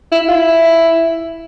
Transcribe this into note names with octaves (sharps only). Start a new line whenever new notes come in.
E4
F4
E4